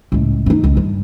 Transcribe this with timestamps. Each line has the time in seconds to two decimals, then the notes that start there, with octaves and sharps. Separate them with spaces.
0.12 C#2 A2
0.46 C#4 D#4
0.64 C#2
0.77 G2